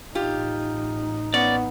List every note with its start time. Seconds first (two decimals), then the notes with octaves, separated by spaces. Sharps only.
0.15 A1 D#4 F4 G4
1.34 B3 C#4 D5